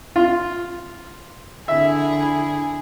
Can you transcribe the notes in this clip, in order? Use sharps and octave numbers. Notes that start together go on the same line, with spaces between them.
F4
D3 E4 G#4 E5